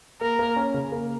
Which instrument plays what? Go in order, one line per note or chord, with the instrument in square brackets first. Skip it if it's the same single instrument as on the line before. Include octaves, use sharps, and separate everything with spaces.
[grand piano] A#3 [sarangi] A#4
[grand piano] A#3
C#4
C#3
A#3